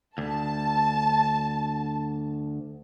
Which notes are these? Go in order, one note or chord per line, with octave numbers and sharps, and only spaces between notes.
D2 A5